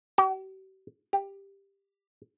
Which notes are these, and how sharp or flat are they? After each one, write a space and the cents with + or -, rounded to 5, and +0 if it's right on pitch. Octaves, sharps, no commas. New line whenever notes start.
G4 -45
G4 +10